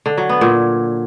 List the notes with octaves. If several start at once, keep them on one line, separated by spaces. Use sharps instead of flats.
D3
F#3
B3
A#2